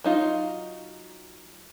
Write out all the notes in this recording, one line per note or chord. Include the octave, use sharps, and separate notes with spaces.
F#3 D#4 F4